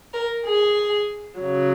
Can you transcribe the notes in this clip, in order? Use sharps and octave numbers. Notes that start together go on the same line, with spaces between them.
A#4
G#4
C#3 F#3